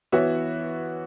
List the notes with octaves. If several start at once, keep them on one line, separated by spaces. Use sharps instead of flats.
E3 B3 F#4 C#5 E5